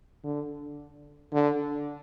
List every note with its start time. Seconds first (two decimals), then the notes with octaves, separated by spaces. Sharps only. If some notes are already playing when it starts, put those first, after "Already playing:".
0.24 D3
1.33 D3